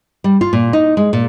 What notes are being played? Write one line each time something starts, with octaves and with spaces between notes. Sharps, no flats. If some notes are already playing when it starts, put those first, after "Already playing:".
G3
F4
A#2
D#4
G#3
A#2